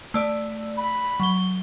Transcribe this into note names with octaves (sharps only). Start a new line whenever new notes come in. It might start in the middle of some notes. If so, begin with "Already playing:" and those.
A3 D5 E6
B5
F#3 G7